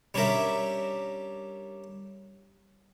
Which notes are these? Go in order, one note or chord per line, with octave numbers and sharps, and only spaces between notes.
G3 C#4 D4 G4 A#4 E5